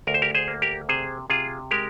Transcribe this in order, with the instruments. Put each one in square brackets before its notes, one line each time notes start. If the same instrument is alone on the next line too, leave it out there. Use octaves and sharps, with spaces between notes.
[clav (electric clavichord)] D2 A#4
C5
G4 A#4
G#4 C5
A#3
G4 A#4
C3 G#4 C5
C3 F4 G#4
G#3 G4 A#4